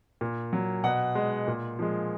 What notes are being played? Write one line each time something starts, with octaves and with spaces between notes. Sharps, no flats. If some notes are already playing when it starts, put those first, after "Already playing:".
A#2
F#3
B2 F#5
G#3
A#2
F3 G#3